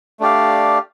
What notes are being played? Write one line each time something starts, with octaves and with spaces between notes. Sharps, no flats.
A3 D4 G4 D5 F5